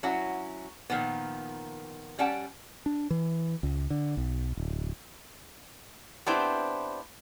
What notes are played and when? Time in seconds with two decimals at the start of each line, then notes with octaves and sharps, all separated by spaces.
0.03 F#3 C#4 E4 F#4
0.90 A#2 D#3 F3 B3
2.19 G3 C#4 F#5 G5 A5
2.86 D4
3.10 E3
3.63 C#2
3.90 D3
4.17 B1
4.57 D1
6.26 B3 C4 D4 E4 G4 C5